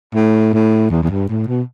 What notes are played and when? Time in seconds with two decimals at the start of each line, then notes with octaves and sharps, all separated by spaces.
0.15 A2
0.53 A2
0.91 E2
1.03 E2
1.10 G2
1.29 A2
1.48 B2